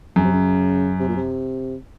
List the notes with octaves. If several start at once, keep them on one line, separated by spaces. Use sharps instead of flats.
F#2 C#3
C3
C#3
C3
A#2
C3